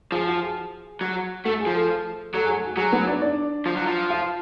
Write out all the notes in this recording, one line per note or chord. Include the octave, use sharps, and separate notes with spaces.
F3 G#4
F#4
G#4
F#3
A3 F#4
G#4
F3
A3 A4
F#3 A3 A4
G#4
A3 A4
F#4
F#3 G#4
B3 B4
D4 D5
D4 D5
F3
F#3
F3
F4 F5